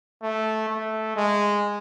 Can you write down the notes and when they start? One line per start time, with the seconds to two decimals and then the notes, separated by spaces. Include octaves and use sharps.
0.23 A3
0.69 A3
1.16 G#3